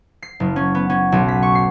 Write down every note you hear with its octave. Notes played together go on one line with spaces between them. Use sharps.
C7
F#1
C#4
B3
C#4
B1
B6
C#6
C7